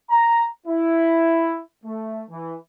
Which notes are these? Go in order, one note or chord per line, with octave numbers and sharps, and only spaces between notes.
A#5
E4
A3
E3